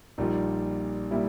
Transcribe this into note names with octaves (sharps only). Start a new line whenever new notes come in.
A#1 A#2 G3 D#4
A#2 G3 E4